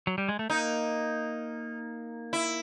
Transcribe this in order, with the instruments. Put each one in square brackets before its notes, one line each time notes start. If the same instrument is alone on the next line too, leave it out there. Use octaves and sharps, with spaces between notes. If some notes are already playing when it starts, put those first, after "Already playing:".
[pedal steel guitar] F#3
G3
G#3
A3
[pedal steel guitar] A#3 [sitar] D#4
[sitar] E4